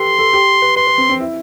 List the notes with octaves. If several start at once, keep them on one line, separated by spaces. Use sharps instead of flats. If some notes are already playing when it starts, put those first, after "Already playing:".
Already playing: G4 A4 B4 C6
A4
G4
B4
B4 C6
B4
C4
C4
E4